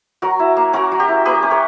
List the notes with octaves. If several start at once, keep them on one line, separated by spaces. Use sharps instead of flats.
F#3 F#4 A#4
E4
A#3
C#4 F#4 A#4
F#3
G4
E4
A#3 G4 B4
C#4
A#4 C#5